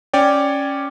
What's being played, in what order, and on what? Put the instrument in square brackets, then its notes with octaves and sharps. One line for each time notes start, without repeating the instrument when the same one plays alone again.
[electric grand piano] C#4 C#5 D5 G5